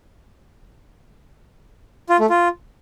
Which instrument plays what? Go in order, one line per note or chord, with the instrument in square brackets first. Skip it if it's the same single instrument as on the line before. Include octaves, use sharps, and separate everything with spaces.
[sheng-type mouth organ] F4
A3
F4